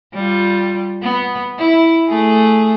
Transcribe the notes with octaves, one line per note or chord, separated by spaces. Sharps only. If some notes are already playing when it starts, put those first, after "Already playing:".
G3 F4
B3
E4
A3 G#4